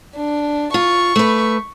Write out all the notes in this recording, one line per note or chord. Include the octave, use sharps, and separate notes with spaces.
D4
F4 C#6
A3 B4